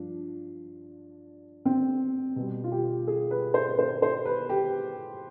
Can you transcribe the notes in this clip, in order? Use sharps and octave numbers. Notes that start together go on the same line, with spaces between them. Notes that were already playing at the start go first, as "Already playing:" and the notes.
Already playing: G2 F3 D4
C4
B2 G3
F4
G4
G#4
B4
C5
C5
C5
B4
G4